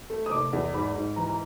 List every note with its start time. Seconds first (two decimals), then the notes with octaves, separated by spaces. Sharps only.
0.10 A3
0.26 D#6
0.31 F1 D6
0.53 E2
0.73 G#2 B5
0.95 G#2
1.16 E3 A#5
1.29 A#5